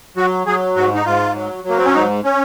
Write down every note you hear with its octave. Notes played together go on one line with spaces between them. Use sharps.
F#3 F#4
F#3 G#4
G#2 F#4
D#4
G#2 F4
F#3
F#3
A#3
C4
C#4
G#2 D#4
C#4